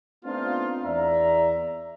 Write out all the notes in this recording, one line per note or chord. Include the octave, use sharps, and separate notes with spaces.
A3 B3 C4 D4 D#4 F4
E2 D5 E5 A#5